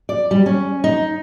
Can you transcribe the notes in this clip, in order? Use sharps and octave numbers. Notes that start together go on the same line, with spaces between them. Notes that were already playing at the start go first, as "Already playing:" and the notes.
D5
G3
C#4
D#4